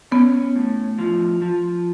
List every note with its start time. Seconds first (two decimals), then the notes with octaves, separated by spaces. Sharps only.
0.11 B3 C#4
0.56 A2
0.98 F3
1.42 F3